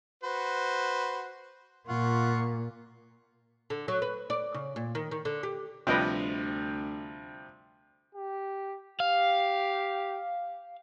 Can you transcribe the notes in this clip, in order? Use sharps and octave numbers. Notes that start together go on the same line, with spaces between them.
F#4 B4 C5
A#2 F4 F#5 C#6
D3
F#3
B4
D5
C#3
A#2
D#3
D#3
D3
G4
D2 C3 F3 G3 B4 D#5 G5
G4
G4 F5